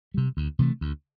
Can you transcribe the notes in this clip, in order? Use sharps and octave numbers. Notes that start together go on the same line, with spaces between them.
C3 G3
D2
C3 E3 A3
D2